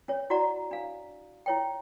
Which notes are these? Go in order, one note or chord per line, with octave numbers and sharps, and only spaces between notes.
C#4 C#5
E4 F#4 D5 F#5 A#5
D4 F5
E4 C#5 G5